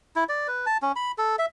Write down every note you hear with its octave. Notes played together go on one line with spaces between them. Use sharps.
E4
D5
B4
A5
C#4
B5
A4
E5